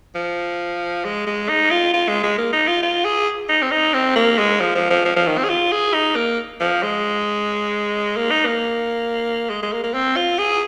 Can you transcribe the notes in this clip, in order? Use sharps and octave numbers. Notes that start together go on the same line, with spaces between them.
F3
G#3
G#3
D#4
F4
F4
G#3
G#3
A#3
D#4
F4
F4
G#4
D#4
C4
D#4
C4
A#3
G#3
F3
F3
F3
F3
F3
D#3
C4
G#4
F4
G#4
D#4
A#3
F3
G#3
A#3
D#4
A#3
G#3
G#3
A#3
A#3
C4
F4
G#4